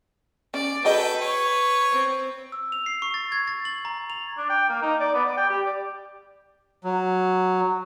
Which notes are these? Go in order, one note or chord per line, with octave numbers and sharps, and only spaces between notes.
C#4 D5
F#4 G#4 A4 B4 D#5 G5
C#5
C4
E6
F7
C7
C#6
A6
G#6
A6
F#7
A#5
F7
D4
G5
A#3
D#4
D5
B3
D5
G5
G4
D5
F#3